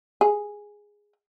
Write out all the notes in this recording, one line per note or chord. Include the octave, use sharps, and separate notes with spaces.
G#4